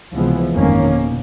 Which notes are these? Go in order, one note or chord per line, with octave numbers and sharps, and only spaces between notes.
C#2 C3 E3 F3 G#3 B3
G1 F2 G#2 D#3 A#3 C#4
B2